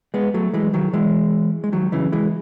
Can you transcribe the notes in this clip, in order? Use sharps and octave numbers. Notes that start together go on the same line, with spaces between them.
G#3 B3
F#3 A3
E3 G#3
D#3 F#3
E3 G#3
G#3
D#3 F#3
C#3 E3
E3 G#3